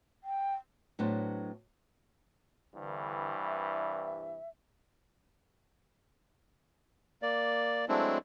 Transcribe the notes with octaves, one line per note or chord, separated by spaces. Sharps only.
G5
A2 F#3 B3 D4 C5
C2 G2 D3 E3
E5
A#3 D5
F#3 G#3 A3 C4 D4 E4